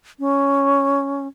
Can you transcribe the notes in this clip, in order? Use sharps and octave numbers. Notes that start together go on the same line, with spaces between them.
C#4